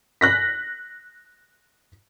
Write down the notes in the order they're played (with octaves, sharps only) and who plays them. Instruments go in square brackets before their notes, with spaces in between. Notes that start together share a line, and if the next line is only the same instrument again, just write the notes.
[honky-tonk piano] F#6 A#6 B6